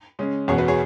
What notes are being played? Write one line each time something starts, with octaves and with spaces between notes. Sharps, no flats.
C#3 G#3 C#4
E2 B2 B3 G#4 C#5
F#4 B4
G#4 C#5